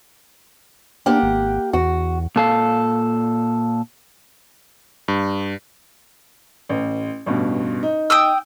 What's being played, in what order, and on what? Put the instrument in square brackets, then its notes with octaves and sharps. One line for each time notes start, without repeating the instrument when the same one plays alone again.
[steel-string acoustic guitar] A#3 G4 F#5 [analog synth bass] D4
[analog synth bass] G#1
[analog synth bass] E2 [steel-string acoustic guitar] F#4
[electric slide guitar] A#2 A4 F5
[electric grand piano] G2
[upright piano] A1
A1 G2 B2
D#4
[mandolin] G5 D#6 E6